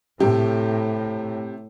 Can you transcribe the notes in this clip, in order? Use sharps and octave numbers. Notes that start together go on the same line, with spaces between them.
A2 C3 G4